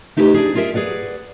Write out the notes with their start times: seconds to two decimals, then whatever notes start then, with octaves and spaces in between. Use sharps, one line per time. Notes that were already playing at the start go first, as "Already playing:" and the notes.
0.17 A3 D#4 E4 G4 A4 B4
0.34 D4 E4 G#4
0.55 F4 G#4 A#4 D5 E5
0.74 G#4 B4 D5 F#5